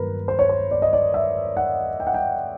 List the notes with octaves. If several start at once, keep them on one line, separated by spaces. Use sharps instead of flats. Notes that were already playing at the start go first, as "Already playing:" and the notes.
Already playing: G2 D#3 F#3 A#3 A#4 B4
C5
C#5
C5
D5
D#5
D5
E5
F#5
G5
F#5
G5